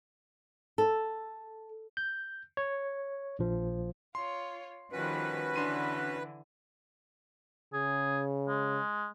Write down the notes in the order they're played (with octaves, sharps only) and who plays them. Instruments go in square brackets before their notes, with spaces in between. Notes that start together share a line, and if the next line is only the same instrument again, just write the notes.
[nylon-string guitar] A4
[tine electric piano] G6
C#5
A#1 F3
[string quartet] F4 C#5 [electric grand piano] C6
[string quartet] D#3 F3 G3 [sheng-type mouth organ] C#4 F#4 [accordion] B4
[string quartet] D3 E3 [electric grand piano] D4 C6 D#7
[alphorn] C#3 [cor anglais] G#4
[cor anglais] G#3